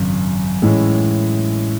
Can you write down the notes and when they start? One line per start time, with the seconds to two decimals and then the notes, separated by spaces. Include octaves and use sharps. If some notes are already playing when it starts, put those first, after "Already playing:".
Already playing: G#1 F#2 C#3
0.62 A2 E3 G#3 C#4 E4